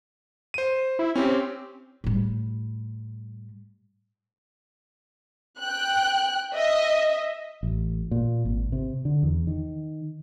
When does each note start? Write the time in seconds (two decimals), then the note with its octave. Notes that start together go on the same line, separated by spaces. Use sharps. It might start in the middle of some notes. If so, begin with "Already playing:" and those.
0.54 C5 D#7
0.99 E4
1.16 C4 C#4 G4
2.04 A2 G3
5.60 G5 F#6
6.54 D#5 E5
7.63 A1
8.11 A#2
8.45 G#1
8.72 C3
9.05 D3
9.23 E2
9.47 D#3